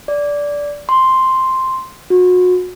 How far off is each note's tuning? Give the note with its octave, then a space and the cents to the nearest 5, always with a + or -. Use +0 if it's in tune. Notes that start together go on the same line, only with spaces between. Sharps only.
D5 -15
C6 +0
F#4 -30